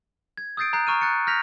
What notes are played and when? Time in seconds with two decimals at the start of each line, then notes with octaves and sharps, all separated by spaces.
0.37 G#6
0.57 D#6 E6 G6 A6 C7 D7
0.73 A#5 F#6 G6 C7
0.87 A#5 C#6 F6 D#7
1.01 F#6 A6 C#7
1.27 F6 G6 A#6 B6 F7